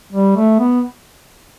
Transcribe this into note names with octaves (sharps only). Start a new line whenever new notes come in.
G3
A3
B3